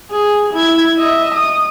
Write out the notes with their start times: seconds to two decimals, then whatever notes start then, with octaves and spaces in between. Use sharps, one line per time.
0.11 G#4
0.54 E4 G#6
0.98 D#5 E5
1.34 D#6